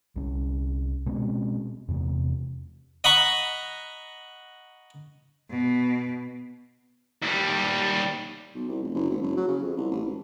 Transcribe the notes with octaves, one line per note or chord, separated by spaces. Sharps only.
C2 C#4
B2 G#3 C4 C#4
E2 C3
D#5 F#5 A#5 B5 C#6
B2
D#2 G3
B1
C2
F1
F#1
G#1
F#1
F#3
C#3
F2
C2
A1
G#1